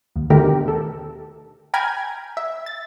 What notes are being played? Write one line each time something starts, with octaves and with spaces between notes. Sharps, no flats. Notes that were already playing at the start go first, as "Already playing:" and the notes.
D#2
B2 D3 D#3 A3 G4 A#4
A4
G5 G#5 A#5 B5 F6 G#6
E5
A6